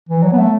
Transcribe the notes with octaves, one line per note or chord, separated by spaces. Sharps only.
E3
F#3
B3
A3